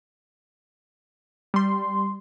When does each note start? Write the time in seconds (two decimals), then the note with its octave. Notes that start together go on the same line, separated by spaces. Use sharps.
1.54 G3 C6